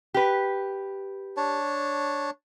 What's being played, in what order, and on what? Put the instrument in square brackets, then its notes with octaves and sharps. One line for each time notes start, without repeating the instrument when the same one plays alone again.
[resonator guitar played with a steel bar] G4 B4
[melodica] D4 C#5 A5